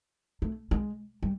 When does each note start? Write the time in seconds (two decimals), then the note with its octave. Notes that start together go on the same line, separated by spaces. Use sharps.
0.42 A3
0.71 G#3
1.23 G3